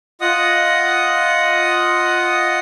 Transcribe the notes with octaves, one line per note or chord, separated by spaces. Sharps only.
F4 D#5 F#5 D#6